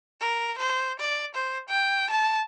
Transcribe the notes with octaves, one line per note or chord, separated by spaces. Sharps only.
A#4
C5
D5
C5
G5
A5